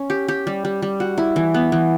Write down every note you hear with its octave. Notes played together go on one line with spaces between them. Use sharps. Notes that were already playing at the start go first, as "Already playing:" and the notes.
Already playing: C#4
G4
G4
G3
G3
G3
F#4
E4
E3
B3
E3